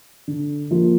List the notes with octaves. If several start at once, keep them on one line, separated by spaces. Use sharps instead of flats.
D3
F3 A#3 F4